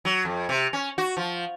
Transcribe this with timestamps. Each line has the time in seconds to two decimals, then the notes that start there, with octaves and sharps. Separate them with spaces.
0.05 F#3
0.25 F2
0.49 C3
0.73 C#4
0.98 F#4
1.17 F3